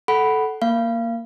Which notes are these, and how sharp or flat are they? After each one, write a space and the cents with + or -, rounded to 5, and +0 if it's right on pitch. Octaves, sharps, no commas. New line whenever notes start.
A4 -10 F#5 +15 B5 +0
A#3 +0 F5 -25